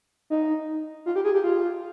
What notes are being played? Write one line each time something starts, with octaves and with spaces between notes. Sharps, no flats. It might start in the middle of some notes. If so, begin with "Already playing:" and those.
D#4
F4
G4
G#4
G4
F4